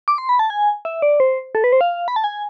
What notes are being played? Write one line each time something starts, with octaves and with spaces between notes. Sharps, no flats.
D6
C6
B5
A5
G#5
E5
D5
C5
A4
B4
C5
F5
B5
A5
G#5